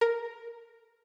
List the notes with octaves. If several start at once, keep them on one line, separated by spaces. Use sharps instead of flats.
A#4